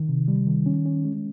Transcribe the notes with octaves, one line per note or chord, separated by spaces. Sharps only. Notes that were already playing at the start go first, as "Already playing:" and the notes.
Already playing: D#3
C3
G3
D#3
C#4
C#4
G#3